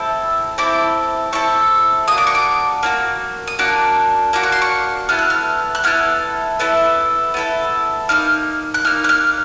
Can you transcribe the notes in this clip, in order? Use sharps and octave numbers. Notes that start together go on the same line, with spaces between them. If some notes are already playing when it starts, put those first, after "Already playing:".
Already playing: C4 E4 A4
C4 E4 A4 D6
C4 E4 A4 C#6
A#3 D4 F#4 D#6
D6
C#6
D6
A#3 D4 F#4
D#6
A#3 D4 F#4 D6
A#3 D4 F#4 D6
C#6
C6
C#6
B3 E4 A4 F6
F#6
F6
F#6
B3 E4 A4 F6
B3 E4 A4
B3 E4 A4
A#3 D#4 F6
F#6
A#3 D#4 F6
F#6
F6